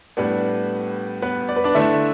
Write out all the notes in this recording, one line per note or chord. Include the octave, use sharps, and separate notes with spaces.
A2 G3 B3 D4 B4
B3 B4
D5
B4
D4 D5
D3 A3 D4 E4 E5